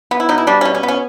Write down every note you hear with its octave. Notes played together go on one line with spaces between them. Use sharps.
B3
E4
B2 D#4
E4
G3 D4
B2 C#4
C#4
B3
C#4